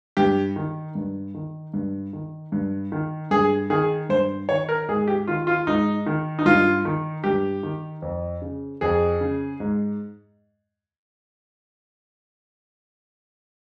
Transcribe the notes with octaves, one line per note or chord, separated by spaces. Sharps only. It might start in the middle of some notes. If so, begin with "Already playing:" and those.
G2 G4
D#3
G2
D#3
G2
D#3
G2
D#3
G2 G#4
D#3 G#4
G2 C5
D#3 C#5
A#4
G#2 G#4
G4
D#3 F4
F4
G#2 D#4
D#3
D#4
G2 F4
D#3
G2 G4
D#3
F2
C#3
F2 G#4
C#3
G#2